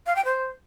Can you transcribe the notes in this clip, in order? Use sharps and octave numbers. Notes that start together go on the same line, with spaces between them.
F5
G5
C5